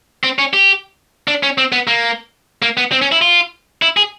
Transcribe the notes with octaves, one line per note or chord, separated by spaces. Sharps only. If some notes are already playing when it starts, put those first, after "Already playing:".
C4
C#4
G4
D4
C#4
C4
B3
A#3
A#3
B3
C4
C#4
E4
F4
E4
G#4